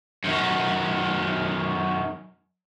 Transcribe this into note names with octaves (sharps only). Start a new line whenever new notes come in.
F#2 D#3